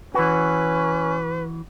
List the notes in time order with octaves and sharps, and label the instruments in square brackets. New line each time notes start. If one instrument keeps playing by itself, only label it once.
[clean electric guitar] E3 F#4 [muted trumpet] C#4 [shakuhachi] B4